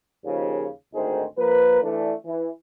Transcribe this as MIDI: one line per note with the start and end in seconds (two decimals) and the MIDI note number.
0.25 0.66 39
0.25 0.66 49
0.25 0.66 53
0.94 1.23 32
0.94 1.23 38
0.94 1.23 51
0.94 1.23 63
0.94 1.23 68
0.94 1.23 72
1.38 1.81 53
1.38 1.81 58
1.38 1.81 70
1.38 1.81 71
1.82 2.13 52
1.82 2.13 57
1.82 2.13 62
2.25 2.48 52